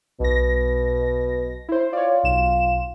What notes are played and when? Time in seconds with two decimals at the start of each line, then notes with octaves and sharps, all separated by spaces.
0.20 B1 B2 A#6
1.69 E4 C5
1.93 F4 C#5 D5
2.23 B1 E7